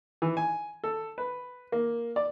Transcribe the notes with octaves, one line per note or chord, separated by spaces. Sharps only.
E3
G#5
A4
B4
A#3
D5